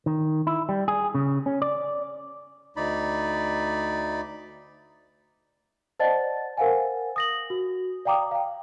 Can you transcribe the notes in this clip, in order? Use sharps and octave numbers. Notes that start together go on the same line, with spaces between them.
D#3
E4
G3
G#4
C#3
C#4
D5
D2 D#4 D5 B5
C5 D5 D#5 F#5 A5 A6
A#4 C5 F5 F#5 G#5
D#6 A#6 F#7
F#4
D5 F5 G5 A#5 D6 D#6
F5 G5